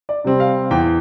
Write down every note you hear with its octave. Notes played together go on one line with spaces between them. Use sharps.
D5
C3 G3 C4
F5
E2 G5